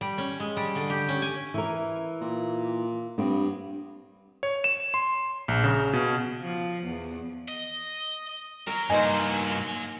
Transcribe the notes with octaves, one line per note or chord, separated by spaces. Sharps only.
G3
C#4
G#3
G3
D3
G4
C#4
G#5
E3 A#4
A#2
G2 B3 C4
C#5
E7
C6
A#1
C#3
B2
F3
E2
D#5
F#3 A#4
G2 A#3 D#4 C5 G#5